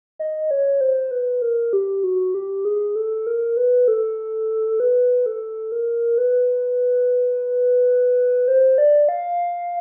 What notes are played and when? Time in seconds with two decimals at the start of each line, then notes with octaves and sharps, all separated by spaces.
0.19 D#5
0.51 C#5
0.81 C5
1.11 B4
1.42 A#4
1.73 G4
2.04 F#4
2.34 G4
2.65 G#4
2.96 A4
3.27 A#4
3.57 B4
3.88 A4
4.80 B4
5.26 A4
5.72 A#4
6.18 B4
8.48 C5
8.78 D5
9.09 F5